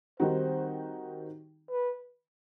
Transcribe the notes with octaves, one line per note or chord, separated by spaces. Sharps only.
D#3 G3 C4 D#4 F#4 C5
B4